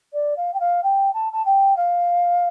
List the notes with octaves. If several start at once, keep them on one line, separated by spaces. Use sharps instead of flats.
D5
F5
G5
F5
G5
A5
A5
G5
F5